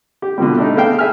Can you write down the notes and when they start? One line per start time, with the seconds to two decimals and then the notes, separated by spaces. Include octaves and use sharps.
0.22 G4
0.38 B2 D3 F3 G3
0.57 A3 D4 D#4
0.76 B3 G#4 A4 F5 G5
0.99 G#4 E5 G#5 F6